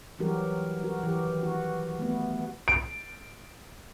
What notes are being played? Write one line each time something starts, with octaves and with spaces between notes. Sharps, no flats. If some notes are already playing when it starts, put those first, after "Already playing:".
E3 F#3 G3 F#4 G4 A#4
F#4 A#4
E3 G4
D#3
F#4
A3 B3
D7